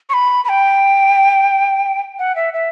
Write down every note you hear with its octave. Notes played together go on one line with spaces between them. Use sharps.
C#6
B5
B5
G5
F#5
E5
E5